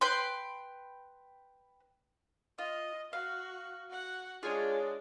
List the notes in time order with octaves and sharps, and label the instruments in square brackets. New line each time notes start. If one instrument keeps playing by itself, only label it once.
[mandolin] B4 G5 C6
[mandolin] F4 [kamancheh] D#5
[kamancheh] F#4 [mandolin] F5
[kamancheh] F#4 F#5
[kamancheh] G#3 D4 [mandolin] F4 [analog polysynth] G#4 C#5